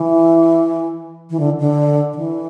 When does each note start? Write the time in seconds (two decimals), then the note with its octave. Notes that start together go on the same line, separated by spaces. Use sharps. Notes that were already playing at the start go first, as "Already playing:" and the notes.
Already playing: E3
1.30 E3
1.40 D3
1.60 D3
2.13 D3
2.17 E3